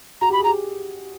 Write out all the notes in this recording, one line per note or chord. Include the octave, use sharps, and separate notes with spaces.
F#4 A#5
G4
B5
G#4
A#5
G4